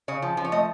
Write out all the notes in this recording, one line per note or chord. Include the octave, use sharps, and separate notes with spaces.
C#3 C#5
F3
F3
C#5
A3 D#5